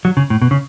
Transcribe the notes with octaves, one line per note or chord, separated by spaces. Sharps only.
F#3
C#3
A2
B2
C#3